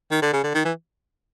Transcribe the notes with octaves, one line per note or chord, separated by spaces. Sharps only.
D#3
D3
C#3
D3
D#3
E3